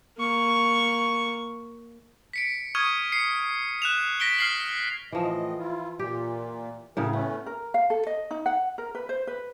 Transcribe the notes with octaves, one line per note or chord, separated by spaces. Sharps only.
A#3 C#6
B6 C#7 D7
C#6 D#6 F6 G#6 D#7
C7 C#7
F#6 E7 F7
A#6 B6 D7 G7
F6 C7 F#7
A2 E3 F3 D#5
E4 F4
A#2 G4
A2 C#3 G#4 A#4
A3 B3 C#4
A#4
F5
A4
D#5
D#4
F#5
A#4
B4
C5
B4